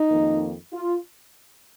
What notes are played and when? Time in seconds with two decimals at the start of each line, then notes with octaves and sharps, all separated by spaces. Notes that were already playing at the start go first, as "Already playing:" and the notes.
Already playing: D#4
0.09 F2 D#3 A#3
0.73 F4